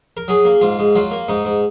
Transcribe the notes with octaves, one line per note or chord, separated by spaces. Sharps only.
A#4
F#3 G#4
A#3
G#2 F4
G#2
F#3 F4
A#3
G#2 D#4
G#2